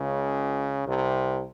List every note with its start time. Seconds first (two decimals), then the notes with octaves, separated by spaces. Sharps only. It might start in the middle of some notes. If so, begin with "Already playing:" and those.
Already playing: C#2 C#3
0.86 C2 C3